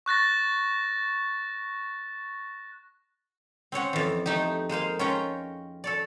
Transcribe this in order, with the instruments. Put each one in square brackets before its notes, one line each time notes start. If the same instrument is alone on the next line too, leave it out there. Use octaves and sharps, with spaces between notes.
[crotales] C#6 F#6 A6 A#6
[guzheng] C4 C#4 C#5 F#5
F2 E3
A3 D#4 G4
G#3 A#3 C5 F5
C#4 F4 B4 C#5 G5 A#5
A4 C#5 D5